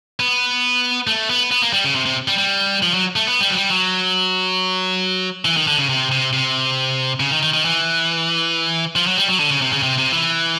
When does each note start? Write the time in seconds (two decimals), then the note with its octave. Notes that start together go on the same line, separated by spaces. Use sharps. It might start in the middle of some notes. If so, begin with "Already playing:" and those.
0.20 B3
1.07 A3
1.30 B3
1.51 B3
1.62 A#3
1.73 G3
1.84 C#3
1.95 C3
2.06 C3
2.28 G3
2.38 G3
2.83 F3
2.94 F#3
3.16 A3
3.27 B3
3.41 G3
3.50 F#3
3.55 G3
3.70 F#3
5.45 E3
5.57 D#3
5.68 D3
5.78 C#3
5.89 C3
6.11 C3
6.33 C3
7.20 C#3
7.31 D#3
7.43 D#3
7.54 D#3
7.65 E3
8.96 F3
9.07 F#3
9.18 G3
9.28 F#3
9.40 D3
9.50 C#3
9.62 C3
9.73 C#3
9.83 C3
9.98 C3
10.12 E3